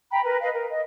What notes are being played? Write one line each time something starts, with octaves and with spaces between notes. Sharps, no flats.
G5 A#5 B5
A#4 B4
B4 D#5 F5
A#4
D#5